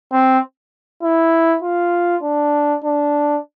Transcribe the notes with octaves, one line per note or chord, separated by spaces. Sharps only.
C4
E4
F4
D4
D4